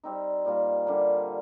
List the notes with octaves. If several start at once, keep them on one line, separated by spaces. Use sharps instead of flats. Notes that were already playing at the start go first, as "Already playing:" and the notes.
G3 C4 D#4
A#2 G3 A#3 F4
D3 G3 A#3